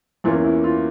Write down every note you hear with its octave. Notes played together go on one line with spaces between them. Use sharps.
E2 E3 A#3 C#4 F4
E4
F4